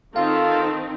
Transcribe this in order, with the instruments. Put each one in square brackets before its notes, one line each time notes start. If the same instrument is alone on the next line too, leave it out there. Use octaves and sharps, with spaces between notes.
[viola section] D#3 C4 D#4 [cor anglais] F4 [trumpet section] A4 [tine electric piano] F5